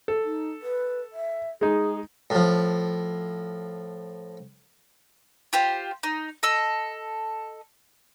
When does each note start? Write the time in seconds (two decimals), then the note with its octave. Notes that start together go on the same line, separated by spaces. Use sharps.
0.08 A4
0.24 D#4
0.62 B4
1.13 E5
1.61 G#3 D#4 G#4
2.30 A2 F3
5.53 F4 G4 C5
6.03 D#4
6.43 A4 D#5 E6